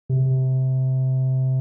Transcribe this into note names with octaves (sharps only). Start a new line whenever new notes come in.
C3